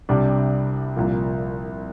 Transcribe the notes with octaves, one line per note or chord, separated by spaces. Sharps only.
C2 C3 G3 D4
C2 A#2 F3 A#3